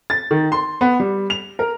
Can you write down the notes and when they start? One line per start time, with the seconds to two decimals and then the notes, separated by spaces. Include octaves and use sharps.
0.10 A6
0.31 D#3
0.52 C6
0.81 B3
1.00 G3
1.30 F7
1.59 A#4